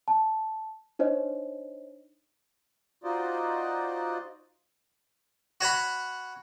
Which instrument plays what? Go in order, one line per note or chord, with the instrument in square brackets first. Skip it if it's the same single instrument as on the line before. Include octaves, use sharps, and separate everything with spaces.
[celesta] A5
D4 D#4 C5 C#5 D#5
[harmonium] D#4 F4 F#4 C5 D5 D#5
[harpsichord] F#4 C#5 F#5 B5